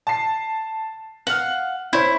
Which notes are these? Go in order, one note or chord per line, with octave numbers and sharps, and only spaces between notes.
A5 C7
F5 F#5 F#7
E4 C5 C#5